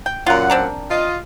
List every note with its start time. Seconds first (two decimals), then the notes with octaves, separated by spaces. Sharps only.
0.06 G5
0.26 F#2 A#2 F4 A#4 F#5
0.50 C4 D4 A#4
0.90 F4 D#5